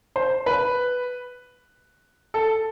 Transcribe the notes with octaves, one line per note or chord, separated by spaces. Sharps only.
C5
B4
A4